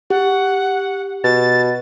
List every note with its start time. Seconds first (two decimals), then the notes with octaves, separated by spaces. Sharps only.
0.10 G4 F#5
1.24 B2 A6